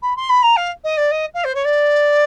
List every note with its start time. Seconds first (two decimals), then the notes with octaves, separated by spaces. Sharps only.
0.02 B5
0.16 C6
0.30 B5
0.43 A#5
0.57 F5
0.84 D#5
0.97 D5
1.11 D#5
1.34 F5
1.44 C5
1.55 C#5
1.65 D5